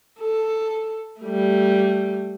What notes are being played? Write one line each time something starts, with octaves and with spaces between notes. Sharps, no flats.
A4
G3 A3